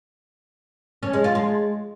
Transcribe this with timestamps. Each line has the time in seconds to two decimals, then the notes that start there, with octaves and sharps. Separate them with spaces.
1.03 C#4
1.13 G#3
1.24 F4
1.35 G#3